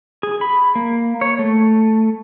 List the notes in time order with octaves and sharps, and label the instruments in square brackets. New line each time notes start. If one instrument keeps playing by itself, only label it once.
[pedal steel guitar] G#4
B5
A#3
C#5
A3